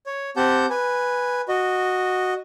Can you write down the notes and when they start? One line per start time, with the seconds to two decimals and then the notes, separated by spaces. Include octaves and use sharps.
0.06 C#5
0.36 C4 G4 F#5 A5 G6
0.70 B4 G#5
1.48 F#4 D#5